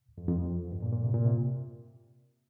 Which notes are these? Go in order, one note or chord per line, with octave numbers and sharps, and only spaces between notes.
F2
F2
F2
G2
A#2
A#2
C3
A#2
C3